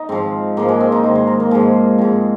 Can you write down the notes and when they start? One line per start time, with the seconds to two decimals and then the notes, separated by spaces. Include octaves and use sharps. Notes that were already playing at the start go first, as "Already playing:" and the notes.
Already playing: D#4
0.09 G#2 F3 C4
0.57 G#2 F3 A#3
0.69 G#3
0.80 C4
0.92 D#4
1.04 G#2 D#3 C5
1.15 C5
1.27 A#4
1.40 A#3
1.51 G#2 F3 G#3
1.98 G#2 F3 C4